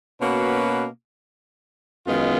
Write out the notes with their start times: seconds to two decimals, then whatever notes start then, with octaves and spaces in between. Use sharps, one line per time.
0.20 B2 A#3 C#4 F#4 B4
2.07 F#2 D#3 G#3 B3 F4